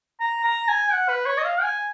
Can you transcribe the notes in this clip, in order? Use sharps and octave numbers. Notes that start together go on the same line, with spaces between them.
A#5
A#5
G#5
F#5
B4
C#5
D#5
F5
G#5